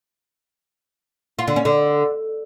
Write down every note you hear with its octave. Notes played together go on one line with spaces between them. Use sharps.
F4
D3
C#4
D3